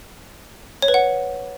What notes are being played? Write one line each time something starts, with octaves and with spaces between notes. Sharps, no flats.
C#5
B4
F#5